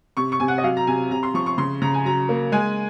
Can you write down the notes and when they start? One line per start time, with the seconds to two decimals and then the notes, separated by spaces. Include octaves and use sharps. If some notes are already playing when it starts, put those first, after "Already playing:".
0.17 C3 C#6
0.32 C#6
0.40 C3 G#5
0.48 F#5
0.58 D#5
0.63 F#3 F5
0.77 A#5
0.87 C3 G#5
1.11 C3 A#5
1.23 C6
1.34 F3 C#6
1.46 C#6
1.58 C#3 C6
1.82 C#3 A#5
1.94 G#5
2.05 F#3 A#5
2.29 A#3
2.52 G#3 G#5